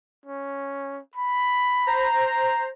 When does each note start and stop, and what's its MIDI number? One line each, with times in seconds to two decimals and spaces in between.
0.26 1.00 61
1.16 2.11 83
1.87 2.68 72
1.87 2.68 82